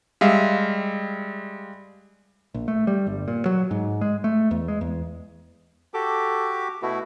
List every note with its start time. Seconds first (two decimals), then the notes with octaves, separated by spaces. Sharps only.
0.21 G3 G#3 E5 F5
2.54 A#1
2.68 A3
2.87 G3
3.07 G1
3.28 A#2
3.46 F#3
3.71 G#2
4.01 G#3
4.24 A3
4.51 E2
4.68 G#3
4.81 E2
5.94 F#4 G4 A4 D6
6.82 B2 A3 E4 F#4